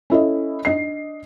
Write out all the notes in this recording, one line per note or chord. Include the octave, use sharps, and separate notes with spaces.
C#4 E4 A4 D#5
D4 D#5 C7